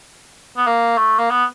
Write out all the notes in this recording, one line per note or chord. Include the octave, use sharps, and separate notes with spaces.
B3
A#3
A3
A#3
B3